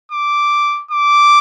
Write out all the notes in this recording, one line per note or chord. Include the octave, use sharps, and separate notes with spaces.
D6
D6